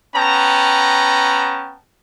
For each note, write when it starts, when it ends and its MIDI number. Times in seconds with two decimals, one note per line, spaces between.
0.15 1.75 59
0.15 1.75 61
0.15 1.75 79
0.15 1.75 81
0.15 1.75 82